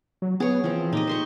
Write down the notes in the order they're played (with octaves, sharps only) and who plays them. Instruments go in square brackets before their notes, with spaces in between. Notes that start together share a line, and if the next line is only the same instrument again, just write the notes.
[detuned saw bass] F#3
[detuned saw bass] B3 [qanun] G#4 C#5
[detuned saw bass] E3 [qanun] F3 C4
[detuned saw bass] A#2 [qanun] D#4 G4 D#5
[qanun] C5 C6 C#6